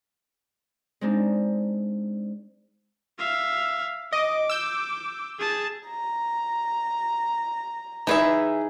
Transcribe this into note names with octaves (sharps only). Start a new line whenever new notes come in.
G#3 C4 D4 D#4
E5 F5
D#5 D6
E6 G6
G#4 A5
A#5
E3 D#4 G#4 B4 E5